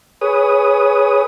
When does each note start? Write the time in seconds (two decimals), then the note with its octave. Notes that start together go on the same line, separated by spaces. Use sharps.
0.21 G#4 B4 C#5 D#6